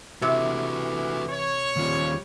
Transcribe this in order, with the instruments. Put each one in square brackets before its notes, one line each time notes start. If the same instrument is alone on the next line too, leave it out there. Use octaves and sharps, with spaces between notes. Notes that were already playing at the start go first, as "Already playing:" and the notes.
[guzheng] C3 [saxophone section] E3 [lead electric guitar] F#4 A4
[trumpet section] C#5
[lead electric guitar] D#2 F4 [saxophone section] F3 G3